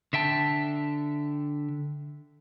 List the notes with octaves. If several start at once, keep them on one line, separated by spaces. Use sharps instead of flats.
D3 E5 G5 A5